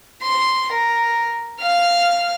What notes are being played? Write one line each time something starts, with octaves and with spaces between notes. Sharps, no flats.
C6
A#4
F5 F6